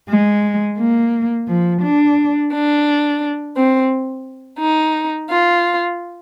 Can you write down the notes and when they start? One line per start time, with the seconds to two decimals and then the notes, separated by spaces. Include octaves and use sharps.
0.09 G#3
0.78 A#3
1.47 F3
1.82 D4
2.51 D4
3.55 C4
4.58 D#4
5.28 F4